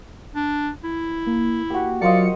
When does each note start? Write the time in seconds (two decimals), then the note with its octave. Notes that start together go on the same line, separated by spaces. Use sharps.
0.35 D4
0.84 E4
1.27 A#3
1.70 A#3 F#4 G4
2.02 F#3 F4 A#4 C5 D5 D#5 F5 C#7